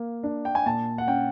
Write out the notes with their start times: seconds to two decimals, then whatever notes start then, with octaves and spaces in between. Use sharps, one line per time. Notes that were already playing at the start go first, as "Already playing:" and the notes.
Already playing: A#3 F5
0.23 D4
0.45 G5
0.55 G#5
0.66 A#2 A5
0.98 F#5
1.07 C#4 G5